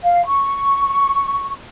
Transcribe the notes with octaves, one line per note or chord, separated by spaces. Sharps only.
F5
C#6